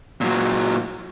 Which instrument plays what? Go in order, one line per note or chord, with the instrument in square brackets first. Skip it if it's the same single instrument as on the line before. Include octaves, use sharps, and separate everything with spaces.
[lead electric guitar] A#2 F#3